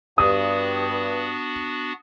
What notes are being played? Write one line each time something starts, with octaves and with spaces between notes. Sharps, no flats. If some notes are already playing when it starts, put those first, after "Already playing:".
G2 B3 D4 F#4 D#6